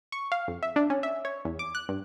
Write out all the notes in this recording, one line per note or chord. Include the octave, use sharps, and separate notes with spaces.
C#6
F5
F2
E5
D4
C#4
E5
C#5
E2
D6
F#6
G2